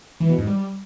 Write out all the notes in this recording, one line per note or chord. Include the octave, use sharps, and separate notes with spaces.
E3
B2
G#2
G3